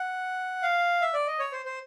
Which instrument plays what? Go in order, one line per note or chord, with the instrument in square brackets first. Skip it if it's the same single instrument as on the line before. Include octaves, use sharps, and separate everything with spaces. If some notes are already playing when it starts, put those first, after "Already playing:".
Already playing: [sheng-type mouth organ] F#5
F5
E5
D5
D#5
C#5
C5
C5